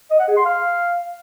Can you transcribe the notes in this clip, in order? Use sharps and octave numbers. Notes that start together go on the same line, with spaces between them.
D#5
F#5
G#4
C6
F5